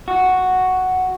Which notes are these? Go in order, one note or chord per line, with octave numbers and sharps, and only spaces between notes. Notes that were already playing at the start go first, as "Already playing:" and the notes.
F#4